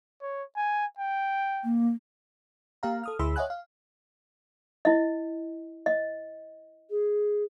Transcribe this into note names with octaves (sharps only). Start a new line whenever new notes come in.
C#5
G#5
G5
A#3
A#3 G4 F5 A#5
A4 D#6 F6
D2 E4 G#4 B5 C6 E6
C#5 D#5 E5 F#5 G#5 F#6
F5
E4 D#5
D#5
G#4